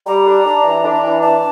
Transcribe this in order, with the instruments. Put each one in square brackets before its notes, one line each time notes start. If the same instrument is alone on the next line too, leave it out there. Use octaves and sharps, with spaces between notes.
[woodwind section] G3 [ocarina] A#5
[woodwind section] D4
D4
E3
D4
E3
[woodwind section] D4 [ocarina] A5